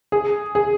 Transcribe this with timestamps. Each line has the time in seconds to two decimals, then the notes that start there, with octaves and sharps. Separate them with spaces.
0.12 G#4
0.55 G#4